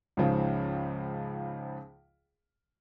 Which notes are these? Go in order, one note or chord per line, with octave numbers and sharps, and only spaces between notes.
C#2 G#2 C#3 F3